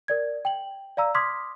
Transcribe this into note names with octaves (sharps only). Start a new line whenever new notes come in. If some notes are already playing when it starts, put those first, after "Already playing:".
A#4 D5 G#6
G5 F#7
D5 F5 A#5 E6
C6 D6 D#6 F6 G#6 B6